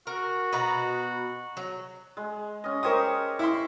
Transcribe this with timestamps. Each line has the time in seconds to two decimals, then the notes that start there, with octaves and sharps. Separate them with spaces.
0.07 F#4 A#4
0.53 B2 B4 A#5
1.57 F#3
2.17 G#3
2.64 C#4 D#5
2.83 G4 A#4 C5 C#5 D#5 D#6
3.39 E4 E5 C6